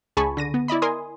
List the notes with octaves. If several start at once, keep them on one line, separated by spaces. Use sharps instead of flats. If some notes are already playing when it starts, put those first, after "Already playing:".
C#2 G#4 G#5 A5 B5 C#6
D3 A#6 D#7
B3
E4 D5 D#5 B5
A#4 G#5 C6 D#6